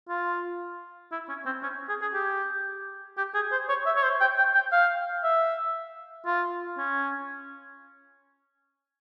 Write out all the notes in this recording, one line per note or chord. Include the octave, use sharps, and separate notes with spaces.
F4
E4
C#4
C4
C#4
G#4
G#4
G4
G4
G#4
C5
C#5
E5
C#5
C5
G5
G5
G5
F5
E5
F4
C#4